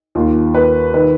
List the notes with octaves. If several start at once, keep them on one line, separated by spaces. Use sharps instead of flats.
D#2 D#3 F4
B4
D#3 B4